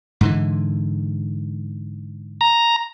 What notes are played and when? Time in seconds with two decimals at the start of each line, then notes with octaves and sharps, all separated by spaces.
0.21 G#2 D3 E3
2.41 A#5